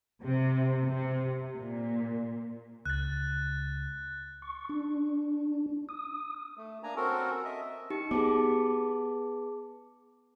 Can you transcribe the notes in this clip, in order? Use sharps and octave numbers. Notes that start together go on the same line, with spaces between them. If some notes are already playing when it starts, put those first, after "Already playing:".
C3
C3
A#2
C#2 F#6 A6
C#6
D4
D#6
A3
A#3 D4 G#5 A#5
C4 C#4 F#4 A4 A#4
D#5 E5
D#4 G4 C#7
B3 G#4 A5 D6